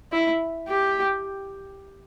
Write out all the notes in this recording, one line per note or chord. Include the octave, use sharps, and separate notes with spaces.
E4
G4